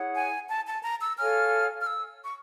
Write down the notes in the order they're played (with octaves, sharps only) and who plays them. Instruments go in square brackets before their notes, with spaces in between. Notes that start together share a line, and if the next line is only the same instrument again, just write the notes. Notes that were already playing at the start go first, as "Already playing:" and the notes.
Already playing: [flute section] E4 G#4 C#5 F#5
[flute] G#5
A5
A5
A#5
E6
[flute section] A4 C#5 F5 G#5 [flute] F6
[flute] F6
E6
C#6